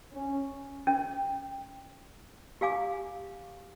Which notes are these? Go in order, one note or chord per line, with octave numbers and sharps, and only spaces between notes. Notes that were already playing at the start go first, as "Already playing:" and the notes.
C#4
C#4
G4 F5 G#5 D6